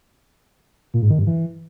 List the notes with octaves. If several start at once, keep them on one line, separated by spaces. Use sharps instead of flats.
A#2
G#2
D#3
G2
E3